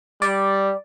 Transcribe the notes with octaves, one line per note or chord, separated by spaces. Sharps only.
G3 D5